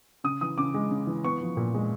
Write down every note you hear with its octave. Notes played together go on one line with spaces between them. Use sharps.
C#3 D#6
E3 D#6
C#3 D6
G#3
C#3
E3
B3 C#6
F3
A#2
G#3